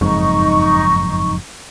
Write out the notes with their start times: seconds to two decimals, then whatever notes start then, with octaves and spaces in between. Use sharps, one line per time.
0.01 F#1 F2 G#2 D#4 C#6